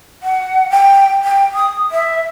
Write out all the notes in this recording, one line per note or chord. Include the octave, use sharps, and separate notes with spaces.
F#5
G5
G5
D#6
E5